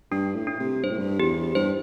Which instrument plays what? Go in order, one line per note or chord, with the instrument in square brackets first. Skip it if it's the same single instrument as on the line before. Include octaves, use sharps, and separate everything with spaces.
[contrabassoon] G2 [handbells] D4
[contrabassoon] A2
[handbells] D4
[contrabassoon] C3
[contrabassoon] G2 [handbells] C5
[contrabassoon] A2
G2
[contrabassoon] E2 [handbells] G4
[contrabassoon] G2 [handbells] C5